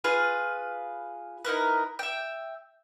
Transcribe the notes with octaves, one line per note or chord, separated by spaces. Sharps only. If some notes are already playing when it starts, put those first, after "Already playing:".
F4 G#4 B4 F5
D#4 E4 A#4 B4
E5 G5